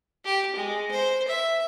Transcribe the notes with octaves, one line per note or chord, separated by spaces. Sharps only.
G4
G#3
C5
E5